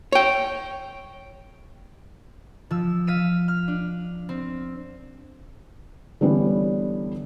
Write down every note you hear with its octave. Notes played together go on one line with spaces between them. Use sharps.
C#5 G5
F3 E6
F5 B6 D#7 E7
F6
D4
C4
D3 E3 G3 B3 C#4